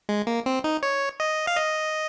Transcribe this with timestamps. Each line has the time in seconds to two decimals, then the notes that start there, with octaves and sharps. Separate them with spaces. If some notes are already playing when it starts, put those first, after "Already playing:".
0.09 G#3
0.27 A#3
0.46 C4
0.64 D#4
0.83 C#5
1.20 D#5
1.47 F5
1.57 D#5